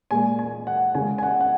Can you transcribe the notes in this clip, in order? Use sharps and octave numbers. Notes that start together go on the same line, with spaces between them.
A#2 G#3 G#5
G#5
F#5
C#3 G#3 G#5
G#5
F#5
F#5